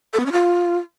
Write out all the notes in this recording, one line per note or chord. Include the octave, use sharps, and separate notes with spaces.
A4
B3
C#4
F4